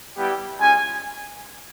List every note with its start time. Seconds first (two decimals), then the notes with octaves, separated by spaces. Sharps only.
0.16 G3 B3 E4 G4
0.59 G#3 C#4 F4 G#5